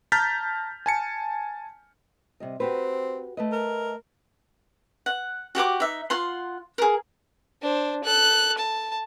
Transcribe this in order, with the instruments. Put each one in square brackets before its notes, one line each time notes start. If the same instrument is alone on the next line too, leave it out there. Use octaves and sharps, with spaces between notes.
[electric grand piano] A5 A#5 F6 G6 A6 B6
G#5 A5 C#7
[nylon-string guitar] C3 G3 D#5
[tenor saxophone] C4 [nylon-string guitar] F#4 G4 B4
[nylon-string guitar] A3 B4 D#5
[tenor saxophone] A#4
[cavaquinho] F#5
F#4 G4 F#5 D6
D#4 E5
F4 F#5 C6
G#4 A#4
[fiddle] D4 C5
A4 F#6
A5